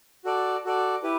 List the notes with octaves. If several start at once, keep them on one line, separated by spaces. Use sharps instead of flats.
F#4 A4 D5
F#4 A4 D5
E4 G4 B4